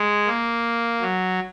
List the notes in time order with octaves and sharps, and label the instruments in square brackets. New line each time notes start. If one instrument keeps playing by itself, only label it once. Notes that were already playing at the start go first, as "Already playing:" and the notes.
Already playing: [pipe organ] G#3
A#3
F#3